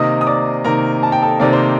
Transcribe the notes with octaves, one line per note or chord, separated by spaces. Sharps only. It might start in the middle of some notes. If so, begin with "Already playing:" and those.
Already playing: C3 D#3 A#3 D#5 D#6
D#6
D5 D6
C3 D#3 A#3 A#4 A#5
A5
G5
A4 A5
C3 D#3 A#3 D5
C5